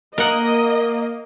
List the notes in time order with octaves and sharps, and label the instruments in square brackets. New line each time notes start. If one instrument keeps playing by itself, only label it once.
[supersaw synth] A#3 [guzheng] A#4 F#5 [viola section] D#5